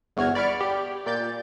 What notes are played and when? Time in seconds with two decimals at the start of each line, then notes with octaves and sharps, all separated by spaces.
0.17 G1 E2 F#4 F6 G#6
0.35 D5 B5 C#6 F6 D7
0.60 G4
1.06 A#2 D5 G6 A6